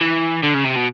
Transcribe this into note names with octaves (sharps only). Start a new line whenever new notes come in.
E3
D3
C#3
C3
B2